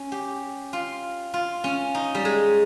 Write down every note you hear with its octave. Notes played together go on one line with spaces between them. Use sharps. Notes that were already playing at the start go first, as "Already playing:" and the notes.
Already playing: C#4
G4
F4
F4
C#4
D#4
G3
G#3